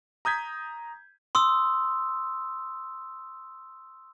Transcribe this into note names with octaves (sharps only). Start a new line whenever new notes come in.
A#5 D#6 G6 G#6 B6
C6 D#6 E6